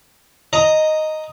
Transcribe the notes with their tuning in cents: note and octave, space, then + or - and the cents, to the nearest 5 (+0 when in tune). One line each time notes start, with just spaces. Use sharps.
D#5 +0 A#5 -5